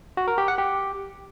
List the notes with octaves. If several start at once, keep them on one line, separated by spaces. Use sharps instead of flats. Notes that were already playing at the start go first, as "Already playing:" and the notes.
F#4
A#4
G4
F#5
G4